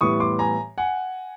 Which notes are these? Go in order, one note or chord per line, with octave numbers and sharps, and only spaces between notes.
A2 E3 G3 B3 C#6 D#6
C6 D6
G#5 A#5
F#5 G#5